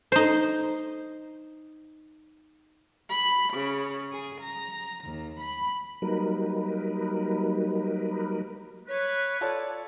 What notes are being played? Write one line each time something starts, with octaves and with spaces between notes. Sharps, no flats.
D#4 C5
B5
C#3
G#4
A#5
D#2
B5
F#3 G3 A#3 D#4 A#4 B4
B4 C#5
F4 A4 C#5 D5